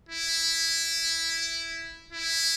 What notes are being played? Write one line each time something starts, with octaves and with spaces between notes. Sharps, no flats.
E4
E4